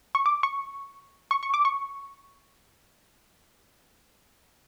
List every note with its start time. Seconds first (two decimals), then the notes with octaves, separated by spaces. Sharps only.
0.15 C#6
0.26 D6
0.43 C#6
1.31 C#6
1.43 C#6
1.54 D6
1.65 C#6